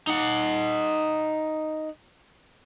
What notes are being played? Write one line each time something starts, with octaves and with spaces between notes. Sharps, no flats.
D#4 F#5